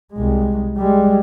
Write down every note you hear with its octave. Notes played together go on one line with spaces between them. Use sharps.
C2 G#3
G3 G#3